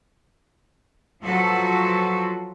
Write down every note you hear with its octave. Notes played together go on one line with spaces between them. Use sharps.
F3 F#3 F4 F#4 A4 B4